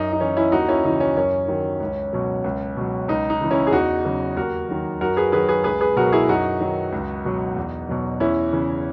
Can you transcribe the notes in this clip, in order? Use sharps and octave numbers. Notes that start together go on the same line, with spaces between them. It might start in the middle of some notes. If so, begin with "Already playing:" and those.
Already playing: F#2 D#4
D#4
E3 C#4
C#4 E4
D#2 D#4 F#4
C#4 E4
C#3 E3 D#4
C#4
F#2 C#4
D#3 F#3
C#2
B2 F#3
C#2
B2 F#3
C#2 D#4
D#4
C#3 E3
C#4 E4
G#4
E2 D#4 F#4
C#3 F#3
D#2 F#4 A#4
D#3 F#3
F#2 F#4 A#4
G#4 B4
D#3 F#3 G#4 B4
G#4 B4
C#2 G#4 B4
G#4 B4
B2 F#3 F#4 A#4
E4 G#4
F#2 D#4 F#4
D#3 F#3
C#2
B2 F#3
E2
B2 F#3
E2 C#4 E4
C#3 E3